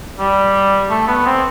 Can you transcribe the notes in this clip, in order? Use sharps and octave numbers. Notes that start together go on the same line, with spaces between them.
G3
A3
B3
C4